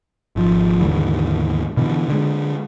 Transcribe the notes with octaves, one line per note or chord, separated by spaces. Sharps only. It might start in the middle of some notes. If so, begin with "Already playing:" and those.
G#1 F3
D#2 G#2 D3 E3
B2 D3 E3
D3 G#3